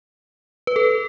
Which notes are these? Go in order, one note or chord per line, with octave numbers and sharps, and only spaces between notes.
B4
A4